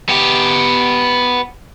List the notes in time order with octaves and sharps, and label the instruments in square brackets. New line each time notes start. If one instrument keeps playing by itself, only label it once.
[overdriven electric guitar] B3 G4